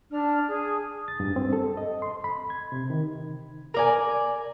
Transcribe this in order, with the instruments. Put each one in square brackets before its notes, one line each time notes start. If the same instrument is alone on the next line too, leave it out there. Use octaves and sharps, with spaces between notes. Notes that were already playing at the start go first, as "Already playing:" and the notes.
[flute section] D4 F6
G#4
[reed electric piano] A6
G2
C4
A4
D#5
C6
B5
G#6
C3
D#3
[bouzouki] A#4 D5 G#5